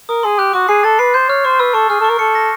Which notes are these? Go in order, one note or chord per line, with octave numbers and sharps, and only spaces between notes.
A#4 D#6
G#4 C6
G4 F#6
F#4 D6
G#4 C7
A4 A6
B4 C7
C5 G6
C#5 F6
C5 C#6
B4 E6
A4 C#6
G#4 F6
A4 C#6
A#4
A4 C#7
A#6